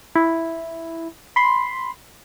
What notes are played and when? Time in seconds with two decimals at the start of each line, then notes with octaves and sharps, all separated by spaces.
0.15 E4
1.36 B5 C6